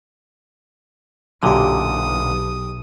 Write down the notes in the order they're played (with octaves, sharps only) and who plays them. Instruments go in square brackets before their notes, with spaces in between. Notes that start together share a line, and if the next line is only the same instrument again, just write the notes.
[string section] B1 [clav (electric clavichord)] F#2 A#2 D3 [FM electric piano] F#3 G4 [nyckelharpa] D#6